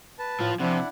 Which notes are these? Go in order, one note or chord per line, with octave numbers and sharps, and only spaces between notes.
B4 A5
A2 F3 F4
C3 F3 D4 E4 F#5